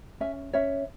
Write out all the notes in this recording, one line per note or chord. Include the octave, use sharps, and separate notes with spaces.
C#4 E5 G#5
C#4 C#5 E5